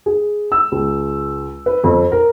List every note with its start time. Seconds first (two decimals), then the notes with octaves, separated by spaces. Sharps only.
0.06 G#4
0.52 E6
0.72 C#2
1.66 B4
1.84 F2
2.12 A#4